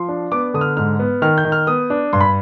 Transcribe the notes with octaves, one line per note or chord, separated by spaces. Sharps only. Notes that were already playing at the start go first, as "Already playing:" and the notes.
Already playing: F3 C6
D4
B3 D6
D3 D#6
F6
G#2 F6
B3
D#3 F6
G6
D#3
F6
B3 D#6
D4
G2 C6
B5